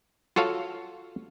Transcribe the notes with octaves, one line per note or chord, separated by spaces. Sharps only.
F4 F#4 A4 C#5 F5